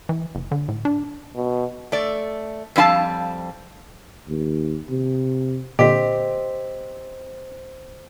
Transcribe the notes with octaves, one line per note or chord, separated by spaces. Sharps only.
E3
F#1
D3
A2
D4
B2
A3 D5
F2 G3 E4 F5 A5
D#2
C3
A#2 D3 C4 G4 D#5 B6